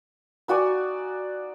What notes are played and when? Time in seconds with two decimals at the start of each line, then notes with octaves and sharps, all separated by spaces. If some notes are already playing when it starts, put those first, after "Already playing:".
0.48 D#4 F#4 D5 G#5